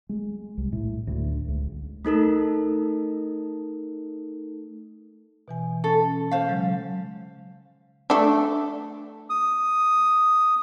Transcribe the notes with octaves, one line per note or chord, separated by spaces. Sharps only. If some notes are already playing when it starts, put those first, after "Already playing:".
G#3
C2
A2
D2
C#2
A3 D#4 A4 A#4
B2 E3 G#5
C#4 A4
C5 F5
C#3 F#3 G#3
A3 D4
D#6